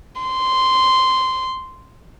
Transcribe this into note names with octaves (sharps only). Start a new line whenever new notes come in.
C6